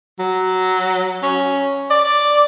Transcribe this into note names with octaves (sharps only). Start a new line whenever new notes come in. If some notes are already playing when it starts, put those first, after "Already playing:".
F#3
C#4
D5